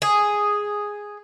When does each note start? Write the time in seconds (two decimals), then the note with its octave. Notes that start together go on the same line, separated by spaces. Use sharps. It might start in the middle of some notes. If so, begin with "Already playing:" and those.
0.02 G#4